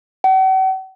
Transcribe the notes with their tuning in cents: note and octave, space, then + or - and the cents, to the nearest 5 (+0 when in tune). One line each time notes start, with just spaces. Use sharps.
F#5 +45